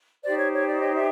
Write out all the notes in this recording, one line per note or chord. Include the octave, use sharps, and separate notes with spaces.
D#4 G4 C5 D5
C#5
C#5
D5
C#5 D#5
D5 E5